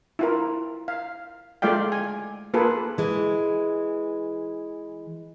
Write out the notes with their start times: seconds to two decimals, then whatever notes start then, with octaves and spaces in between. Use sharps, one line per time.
0.19 E4 F4 A#4
0.88 F5
1.62 G#3 A3 F4 D5 F5 G5
1.92 G#5
2.54 A#3 F4 G#4 A4 B4
2.98 E3 G#3